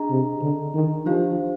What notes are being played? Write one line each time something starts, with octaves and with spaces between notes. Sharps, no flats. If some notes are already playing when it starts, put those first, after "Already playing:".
Already playing: D4 G#4 D#5 A#5
C3
D3
D#3
F3 D4 G4 C5 F5